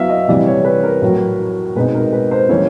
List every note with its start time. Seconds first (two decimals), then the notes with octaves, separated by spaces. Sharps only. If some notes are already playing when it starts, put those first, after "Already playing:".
Already playing: F#3 B3 E4 E5 F5
0.10 D#5
0.28 C3 E3 G3 D5
0.47 C#5
0.65 B4
0.83 A#4
1.01 A2 F#3 A3
1.76 B2 G#3 C4 D#4 B4
1.94 A#4
2.13 B4
2.31 C5
2.49 E3 G3 A#3 C#4 E4 C#5